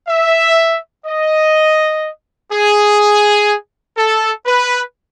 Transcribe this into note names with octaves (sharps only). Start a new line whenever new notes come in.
E5
D#5
G#4
A4
B4